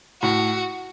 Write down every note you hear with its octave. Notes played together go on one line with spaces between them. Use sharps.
A2 F#4